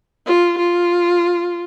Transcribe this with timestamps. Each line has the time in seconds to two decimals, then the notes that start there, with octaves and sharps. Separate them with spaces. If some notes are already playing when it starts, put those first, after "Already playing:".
0.26 F4
0.58 F4